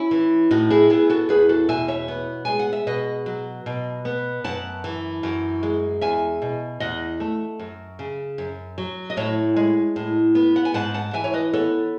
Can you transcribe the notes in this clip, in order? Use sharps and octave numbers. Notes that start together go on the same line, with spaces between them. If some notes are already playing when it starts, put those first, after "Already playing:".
Already playing: C#4 E4
E3
A2 D#4 F#4
E4 G#4
B3 E4 G#4
F#4 A4
E2 G#4 B4
F#4 A4
B2 E5 G#5
C#5 E5
B3
G#3 G#5
F#5
E5
B2 B4 D#5
F#3
B2
B3
F#2 F#5 A5
E3
F#2
G#3
E2 E5 G#5
B2
E2 D#5 F#5
A3
F#2
C#3
F#2
F#3
D#5
A2 C#5 E5
G#3
A2
B3
F#5
G#5
G#2 F#5 A5
F#5 A5
E3 E5 G#5
C#5
B4 D#5
B3 A4 C#5